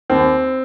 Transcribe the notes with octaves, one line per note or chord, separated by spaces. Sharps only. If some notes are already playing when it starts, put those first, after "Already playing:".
D#2 C4